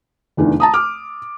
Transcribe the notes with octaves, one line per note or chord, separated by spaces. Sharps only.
F1 E2 D3 D#3
A5 A#5 D#6
D6 F6